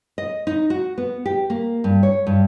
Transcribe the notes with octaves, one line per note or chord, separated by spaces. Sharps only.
D#5
D#4
F#4
B3
G4
A#3
G2
C#5
G2